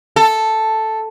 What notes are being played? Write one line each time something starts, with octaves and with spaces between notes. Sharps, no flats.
A4